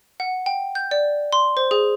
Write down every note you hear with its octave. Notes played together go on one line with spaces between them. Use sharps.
F#5
G5
G6
D5
C6
C5
G#4